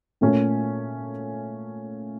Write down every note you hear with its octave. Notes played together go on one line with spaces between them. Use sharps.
A#2 A3 C#4 F4